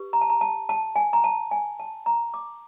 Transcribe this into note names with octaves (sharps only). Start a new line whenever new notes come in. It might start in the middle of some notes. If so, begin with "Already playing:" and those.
Already playing: G4 B4
A#5
A5
A#5
A5
A5
G#5
A#5
A5
G#5
A5
A#5
D6